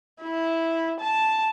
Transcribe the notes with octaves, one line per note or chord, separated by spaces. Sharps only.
E4
A5